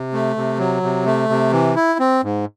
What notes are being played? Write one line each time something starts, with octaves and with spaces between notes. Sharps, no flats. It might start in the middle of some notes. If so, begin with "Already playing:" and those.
Already playing: C3
A3
C3
F#3
C3
A3
C3
E3
E4
C4
G#2